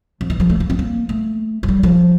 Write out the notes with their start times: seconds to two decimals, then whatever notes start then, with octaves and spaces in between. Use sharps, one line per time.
0.21 F2
0.30 E3
0.40 F3
0.50 A3
0.60 A#3
0.70 C4
0.79 A#3
1.09 A3
1.63 F3
1.68 G3
1.83 F3